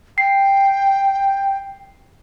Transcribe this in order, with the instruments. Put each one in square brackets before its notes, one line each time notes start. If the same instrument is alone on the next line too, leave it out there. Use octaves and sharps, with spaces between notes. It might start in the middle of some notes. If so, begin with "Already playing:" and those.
[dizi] G5 [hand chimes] C7